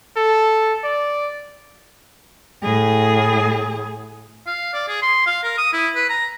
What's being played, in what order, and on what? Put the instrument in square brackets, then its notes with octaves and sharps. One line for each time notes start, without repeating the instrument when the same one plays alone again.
[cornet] A4
D5
[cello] A2 G#4
[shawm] F5
D5
G#4
C6
F5
A#4
D#6
E4
B4
A#5